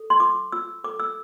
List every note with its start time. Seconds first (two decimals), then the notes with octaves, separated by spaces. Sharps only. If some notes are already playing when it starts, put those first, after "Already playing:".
Already playing: A4
0.10 C6
0.20 F4 D6
0.52 F4 E6
0.84 A4 D6
1.00 E6